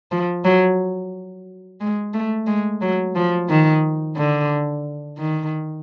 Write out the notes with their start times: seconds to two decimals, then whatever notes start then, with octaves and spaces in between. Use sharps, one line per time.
0.12 F3
0.45 F#3
1.80 G#3
2.14 A3
2.47 G#3
2.81 F#3
3.15 F3
3.49 D#3
4.16 D3
5.18 D#3